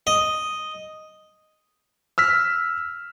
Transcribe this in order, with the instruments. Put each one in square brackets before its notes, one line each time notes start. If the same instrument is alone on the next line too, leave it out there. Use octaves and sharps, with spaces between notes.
[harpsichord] D#5
[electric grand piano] E6 F6 B6